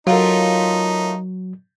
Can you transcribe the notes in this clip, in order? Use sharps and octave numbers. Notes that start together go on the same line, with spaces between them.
F#3 A3 D#4 F4 A#4 C#5